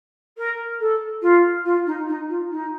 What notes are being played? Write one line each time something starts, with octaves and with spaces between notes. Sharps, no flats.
A#4
A4
F4
F4
D#4
D#4
F4
D#4